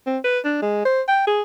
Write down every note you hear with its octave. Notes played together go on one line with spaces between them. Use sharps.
C4
B4
D4
G#3
C5
G5
G#4